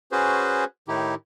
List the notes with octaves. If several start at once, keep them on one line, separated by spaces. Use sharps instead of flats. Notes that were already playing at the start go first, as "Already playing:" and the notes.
C#4 F#4 G#4 B4 C5
A2 D#3 D#4 E4 G4